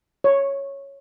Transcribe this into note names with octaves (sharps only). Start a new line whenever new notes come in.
C#5